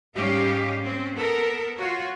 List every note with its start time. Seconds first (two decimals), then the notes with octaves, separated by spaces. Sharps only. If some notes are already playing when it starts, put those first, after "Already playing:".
0.15 G#2 G3 C#4 G4 D#5 F5
0.82 C4 C#4
1.14 B3 A4 A#4
1.76 F4 F#4 C#5